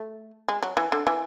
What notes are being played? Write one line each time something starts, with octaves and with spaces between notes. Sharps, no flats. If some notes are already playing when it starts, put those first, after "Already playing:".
Already playing: A3
G#3
F#3
E3
D3
E3